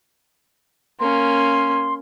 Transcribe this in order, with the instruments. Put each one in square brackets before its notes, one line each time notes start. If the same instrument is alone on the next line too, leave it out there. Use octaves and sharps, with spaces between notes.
[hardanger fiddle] A#3 C#4 [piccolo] C6